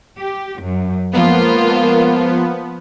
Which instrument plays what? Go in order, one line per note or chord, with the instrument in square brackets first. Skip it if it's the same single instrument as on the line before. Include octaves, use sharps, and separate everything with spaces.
[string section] G4
F#2
[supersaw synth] F3 B3 [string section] G#3 A#3 F4